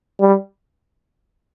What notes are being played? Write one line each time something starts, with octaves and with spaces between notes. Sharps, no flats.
G3